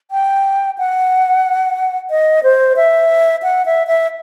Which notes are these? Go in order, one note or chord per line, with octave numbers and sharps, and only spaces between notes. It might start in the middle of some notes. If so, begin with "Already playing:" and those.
G5
F#5
D#5
C5
E5
F#5
E5
E5